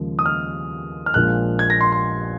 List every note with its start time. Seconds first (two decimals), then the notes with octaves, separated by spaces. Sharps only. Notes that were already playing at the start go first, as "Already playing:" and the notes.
Already playing: D#2 C#3 F3 G#3
0.19 D#6
0.26 F6
1.06 F6
1.14 A#1 A#2 F3 G#3 F#6
1.59 G#6
1.70 A#6
1.81 C6
1.92 C6